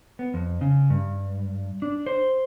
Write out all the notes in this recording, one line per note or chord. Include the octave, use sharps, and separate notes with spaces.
B3
F2
C#3
G2
D4
C5